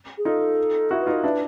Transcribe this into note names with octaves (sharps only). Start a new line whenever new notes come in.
G#4
D#4 F4 A4
E4 F#4 A#4
B4
D#4 F4
A#4
D4 E4 B4